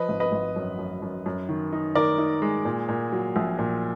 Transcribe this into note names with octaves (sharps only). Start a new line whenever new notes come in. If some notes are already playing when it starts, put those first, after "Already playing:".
Already playing: F3 B4 D#5
G#1
B4 D#5
G#1
F#2
F#2
F#2
F#2
D#3
D#4
D#3 A#4 D5
D#4
G#3
A#2
A#2
F#3
A#1
A#2